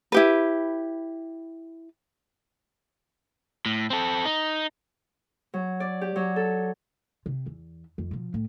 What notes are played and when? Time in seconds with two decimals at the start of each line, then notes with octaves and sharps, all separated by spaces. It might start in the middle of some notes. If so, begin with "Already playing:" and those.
0.12 E4 G4 B4
3.66 A2
3.90 C4 A4
4.25 D#4
5.54 F#3
5.80 D5
6.01 G4
6.16 F#3
6.36 A4
7.26 C3
7.46 E2
7.98 F2
8.11 B2 F3
8.34 A2